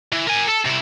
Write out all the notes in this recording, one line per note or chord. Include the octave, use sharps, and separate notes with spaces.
E3
A#4 G#5
A4
C3 E4